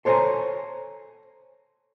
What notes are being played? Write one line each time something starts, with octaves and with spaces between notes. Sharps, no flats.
A4 C5 C#5 E5 G#5 A#5